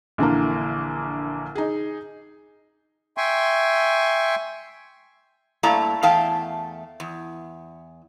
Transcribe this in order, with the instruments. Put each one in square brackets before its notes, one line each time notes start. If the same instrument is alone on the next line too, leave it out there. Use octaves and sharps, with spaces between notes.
[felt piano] A#1 D3 E3 A#3
D#4 G#4
[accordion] E5 G5 G#5 C6 C#6
[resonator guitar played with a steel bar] G2 A3 A#3 E4 D5 A#5
E2 A3 F5 G5 A5
E2